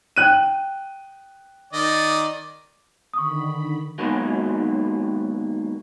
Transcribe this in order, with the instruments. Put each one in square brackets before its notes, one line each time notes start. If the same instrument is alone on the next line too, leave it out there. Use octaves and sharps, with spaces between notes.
[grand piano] G5 F#6 D#7
[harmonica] D#3 D5 D#5
[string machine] D3 D#3 B5 [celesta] C#6 D#6
[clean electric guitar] G#2 B2 D#3 F#3 G#3 A#3